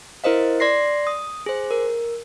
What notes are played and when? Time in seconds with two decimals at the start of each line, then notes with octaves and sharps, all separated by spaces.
0.24 E4 A#4 C5 D#5 F5
0.60 D5 C6 A#6 C7
1.07 D#6
1.46 G#4 C5
1.71 A#4